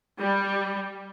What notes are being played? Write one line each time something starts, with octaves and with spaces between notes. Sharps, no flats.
G3